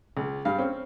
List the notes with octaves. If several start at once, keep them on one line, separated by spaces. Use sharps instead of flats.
C#2
G2 F5
C4 C#4